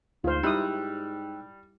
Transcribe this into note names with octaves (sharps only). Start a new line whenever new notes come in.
D2 G#2 F4 C5 F6
G3 D#4 E4 G5 D#6 E6 F#6